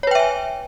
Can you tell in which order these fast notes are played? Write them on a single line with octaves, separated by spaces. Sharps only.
C#5 B4 G5 E5 G#5